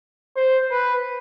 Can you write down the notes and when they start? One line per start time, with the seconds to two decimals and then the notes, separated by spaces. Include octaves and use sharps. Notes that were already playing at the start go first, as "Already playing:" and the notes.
0.36 C5
0.71 B4